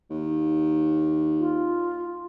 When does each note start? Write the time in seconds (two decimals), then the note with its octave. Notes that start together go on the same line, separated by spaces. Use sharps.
0.10 D#2
1.39 F4